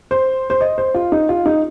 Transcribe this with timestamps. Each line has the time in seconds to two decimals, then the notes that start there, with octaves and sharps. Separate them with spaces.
0.11 C5
0.50 C5
0.61 D#5
0.78 C5
0.94 F4
1.12 D#4
1.29 F4
1.46 D#4